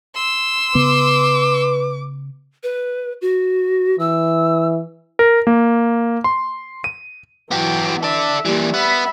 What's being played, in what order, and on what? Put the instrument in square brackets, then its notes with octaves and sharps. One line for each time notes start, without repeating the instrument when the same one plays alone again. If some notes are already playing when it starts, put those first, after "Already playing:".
[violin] C6 E6
[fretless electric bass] C#3 B3 [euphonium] B4 [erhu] D6
[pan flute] B4
F#4
[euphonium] E3 [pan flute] E6
[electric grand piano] A#4
A#3
C6
D#7
[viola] E3 F#3 [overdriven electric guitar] B3 G4
[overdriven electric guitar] A4 D5 [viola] E5
[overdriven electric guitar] A#2 E3 [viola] G3
[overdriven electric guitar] B3 [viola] E5 B5